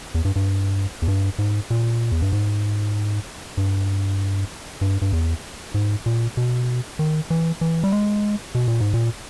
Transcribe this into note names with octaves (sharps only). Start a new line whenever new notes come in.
E2
G2
G2
E2
G2
G#2
A#2
E2
G2
G#2
G2
G2
G2
E2
G#2
A#2
B2
D#3
E3
E3
G3
G#3
B2
A#2
G#2
A#2